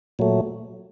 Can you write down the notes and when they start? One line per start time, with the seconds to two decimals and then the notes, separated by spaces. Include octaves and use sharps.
0.19 A#2 F#3 A3